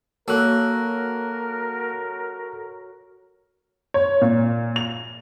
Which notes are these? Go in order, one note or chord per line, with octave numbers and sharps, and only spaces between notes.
F#3 A#3 F#4 A4 A#4 E6 F#6
C#5
A#2
F7